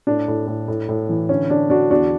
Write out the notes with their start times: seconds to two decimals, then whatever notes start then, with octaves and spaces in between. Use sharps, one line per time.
0.07 A2 D4
0.28 A2
0.47 A2
0.68 A2
0.89 A2
1.09 E3
1.29 D3 C#4
1.50 D3 D4
1.70 D3 D4 F#4
1.90 E2 D4 F#4